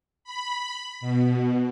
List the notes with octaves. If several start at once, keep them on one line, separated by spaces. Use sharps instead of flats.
B5
B2